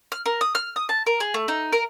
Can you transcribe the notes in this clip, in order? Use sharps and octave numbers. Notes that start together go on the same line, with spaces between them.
F6
A#4
D#6
F6
D#6
A5
A#4
G#4
A3
D#4
A#4